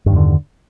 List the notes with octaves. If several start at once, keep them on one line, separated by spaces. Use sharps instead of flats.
E2 G2 D3 D#3